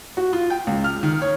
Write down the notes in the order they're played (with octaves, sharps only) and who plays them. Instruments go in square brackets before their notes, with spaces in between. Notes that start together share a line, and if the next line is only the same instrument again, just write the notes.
[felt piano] F#4
F4
G5
C#2
F6
D#3
C#5